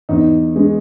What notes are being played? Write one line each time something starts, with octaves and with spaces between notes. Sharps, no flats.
E2 D#4
G#3